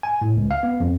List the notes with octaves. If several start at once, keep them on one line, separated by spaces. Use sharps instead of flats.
G#5
A2
C#2
F5
B3
F2